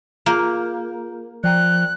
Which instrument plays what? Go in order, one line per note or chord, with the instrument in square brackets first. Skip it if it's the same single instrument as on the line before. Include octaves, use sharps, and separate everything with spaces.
[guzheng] A#3 [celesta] F4 G#4 G6
[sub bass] F3 [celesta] D5 G5 A#5 [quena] F#6